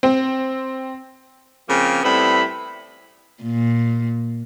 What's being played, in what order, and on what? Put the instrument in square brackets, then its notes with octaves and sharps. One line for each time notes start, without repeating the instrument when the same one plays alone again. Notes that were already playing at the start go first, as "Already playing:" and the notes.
[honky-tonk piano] C4
[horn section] C#3 F3 A#3 C4
A2 G3 B3 C4 E4 B5
[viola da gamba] A#2